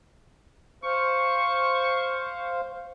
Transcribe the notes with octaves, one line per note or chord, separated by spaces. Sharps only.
C5 F5 C#6